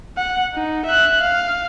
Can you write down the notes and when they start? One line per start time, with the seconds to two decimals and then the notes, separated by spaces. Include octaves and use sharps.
0.17 F#5
0.54 D#4
0.86 E5 F#6
1.21 F5